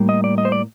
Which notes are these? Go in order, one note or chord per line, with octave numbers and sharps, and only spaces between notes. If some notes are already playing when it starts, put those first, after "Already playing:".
Already playing: A2 G3 A#3
D#5
D5
D#5
C5
D5